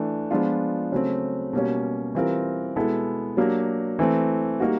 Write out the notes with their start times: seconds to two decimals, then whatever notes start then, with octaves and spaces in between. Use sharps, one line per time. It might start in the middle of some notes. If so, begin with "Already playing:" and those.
Already playing: E3 A3 D4
0.31 F3 G#3 B3 D4 F4
0.92 C#3 F#3 A3 C4
1.53 B2 G3 A#3 C#4
2.15 E3 G3 C4 F4 A#4
2.76 B2 G#3 B3 E4 A4
3.37 F#3 A#3 D4 G4
3.99 E3 A3 C4
4.60 G3 A#3 D#4 F#4